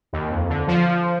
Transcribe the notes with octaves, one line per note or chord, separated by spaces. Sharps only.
D#2
F2
D3
F3